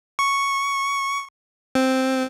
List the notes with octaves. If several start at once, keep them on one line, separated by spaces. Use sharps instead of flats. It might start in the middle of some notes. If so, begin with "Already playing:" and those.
C#6
C4